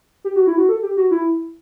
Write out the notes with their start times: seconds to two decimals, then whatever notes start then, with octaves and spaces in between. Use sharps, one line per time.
0.24 G4
0.36 F#4
0.47 E4
0.58 F#4
0.69 A4
0.83 G4
0.97 F#4
1.11 E4